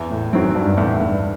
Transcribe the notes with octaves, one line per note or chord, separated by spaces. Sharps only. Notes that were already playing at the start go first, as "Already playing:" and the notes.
Already playing: E2
A2
F#2 D#3 F#3 C4
G2
E2 A2
G2